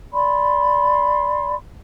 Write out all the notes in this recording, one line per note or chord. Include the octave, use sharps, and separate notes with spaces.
D5 B5 C6